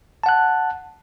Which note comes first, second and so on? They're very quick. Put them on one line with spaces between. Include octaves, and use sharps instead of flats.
A5 F#5 F#6